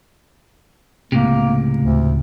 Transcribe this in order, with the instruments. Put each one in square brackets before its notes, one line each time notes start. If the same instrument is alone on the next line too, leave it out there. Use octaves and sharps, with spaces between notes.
[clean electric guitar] C#2 A2 C3 [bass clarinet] A#3
[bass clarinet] D2